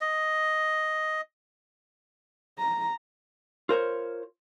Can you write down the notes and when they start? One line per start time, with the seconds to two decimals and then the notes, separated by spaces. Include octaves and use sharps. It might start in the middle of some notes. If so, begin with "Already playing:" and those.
0.01 D#5
2.58 A#5
3.69 F4 A#4 C5 C#5